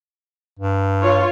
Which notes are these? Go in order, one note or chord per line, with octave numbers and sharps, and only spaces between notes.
G2
F4 C#5